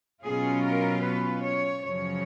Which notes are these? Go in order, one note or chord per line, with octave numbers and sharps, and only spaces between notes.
B2 F#3 C#4 F4 G#4
A#4
B4
C#5
F#2 C#3 F3 C#5